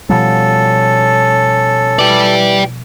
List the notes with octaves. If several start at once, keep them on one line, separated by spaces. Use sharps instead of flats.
B2 F3 G3 C#4 A4
E3 G4 D5